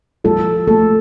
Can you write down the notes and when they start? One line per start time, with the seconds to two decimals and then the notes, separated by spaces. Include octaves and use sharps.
0.24 F3 A4
0.67 A3 A4